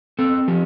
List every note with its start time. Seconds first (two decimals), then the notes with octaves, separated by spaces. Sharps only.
0.19 C4 A4
0.48 F3 G4